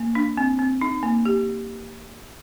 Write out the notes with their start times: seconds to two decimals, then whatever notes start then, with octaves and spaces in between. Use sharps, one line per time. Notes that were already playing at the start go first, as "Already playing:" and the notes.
Already playing: A#3
0.15 D4
0.37 C4
0.59 C4
0.81 D#4
1.03 A#3
1.25 G4